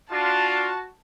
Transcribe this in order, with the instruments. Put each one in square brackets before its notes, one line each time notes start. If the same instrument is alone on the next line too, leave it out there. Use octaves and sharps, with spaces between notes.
[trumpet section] D4 F4 [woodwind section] F#4 [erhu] A5